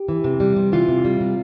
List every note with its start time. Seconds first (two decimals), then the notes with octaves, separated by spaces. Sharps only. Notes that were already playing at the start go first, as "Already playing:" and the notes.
Already playing: G4
0.08 E3
0.24 C3
0.40 G3
0.56 C3
0.72 E3 F4
0.88 C3
1.05 G3
1.20 C3